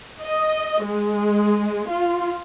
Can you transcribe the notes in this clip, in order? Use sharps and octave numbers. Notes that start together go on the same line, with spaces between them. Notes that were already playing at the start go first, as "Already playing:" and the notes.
D#5
G#3
F4